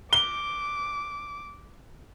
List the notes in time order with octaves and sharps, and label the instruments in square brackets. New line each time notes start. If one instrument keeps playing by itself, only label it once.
[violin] D6 [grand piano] G7